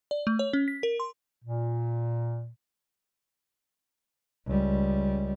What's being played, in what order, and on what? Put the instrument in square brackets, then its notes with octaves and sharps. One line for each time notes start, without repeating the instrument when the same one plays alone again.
[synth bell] D5
A3
C#5
C#4
B6
A#4
C6
[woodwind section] A#2
[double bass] C#2 G3